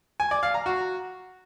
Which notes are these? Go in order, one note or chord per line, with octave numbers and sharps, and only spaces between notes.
G#5
D5
F5
A#5
F#4